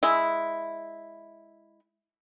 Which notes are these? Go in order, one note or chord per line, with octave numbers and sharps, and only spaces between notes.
G#3 E4